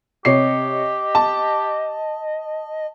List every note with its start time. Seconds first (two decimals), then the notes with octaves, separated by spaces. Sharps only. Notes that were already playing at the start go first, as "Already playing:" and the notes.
0.25 C3 G4 C#5 D#5 C7
1.15 A5